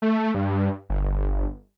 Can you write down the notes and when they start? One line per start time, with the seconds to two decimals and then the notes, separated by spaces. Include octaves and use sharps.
0.02 A3
0.35 G2
0.89 G1